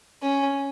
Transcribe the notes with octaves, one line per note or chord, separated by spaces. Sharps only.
C#4